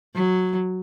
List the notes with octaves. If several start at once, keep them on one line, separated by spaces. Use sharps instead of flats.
F#3